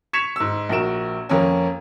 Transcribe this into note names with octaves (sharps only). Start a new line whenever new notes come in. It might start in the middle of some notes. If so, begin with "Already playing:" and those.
C#6 G#6 B6 C#7 E7 F7
G#2 E6
A#1 F#4 A#4 D7 E7
F2 A#3 C#4